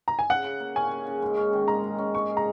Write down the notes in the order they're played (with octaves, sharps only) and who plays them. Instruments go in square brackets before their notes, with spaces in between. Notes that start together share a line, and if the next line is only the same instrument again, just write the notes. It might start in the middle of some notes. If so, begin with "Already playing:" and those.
[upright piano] A#5
G#5
[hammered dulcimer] C#3 [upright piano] F#5
[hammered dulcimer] C#3
A#3
[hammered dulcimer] C#4 [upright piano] G#5
[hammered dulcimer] C#3
C#3
G#2
C#4
D#3
[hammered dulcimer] G#3 [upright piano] A#5
[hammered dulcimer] G#2
C#4
[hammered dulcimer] G#2 [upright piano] C#6
[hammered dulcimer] G#4
[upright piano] A#5